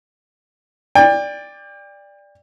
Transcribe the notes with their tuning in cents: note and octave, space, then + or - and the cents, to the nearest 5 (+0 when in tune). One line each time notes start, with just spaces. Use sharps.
D5 +0 G5 +35